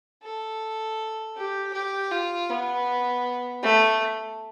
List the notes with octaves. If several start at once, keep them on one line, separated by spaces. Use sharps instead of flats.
A4
G4
G4
F4
B3
A3